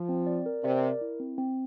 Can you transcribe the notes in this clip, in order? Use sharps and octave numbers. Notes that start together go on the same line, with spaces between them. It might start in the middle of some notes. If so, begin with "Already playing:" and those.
Already playing: F3
C4
D5
A#4
C3 D5
A#4
E4
C4
C4